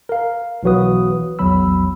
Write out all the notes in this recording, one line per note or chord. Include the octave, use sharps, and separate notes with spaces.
A#4 F5
B1 E3 F#3 F#4 B4 D#6
A#1 E2 F#3 B5 E6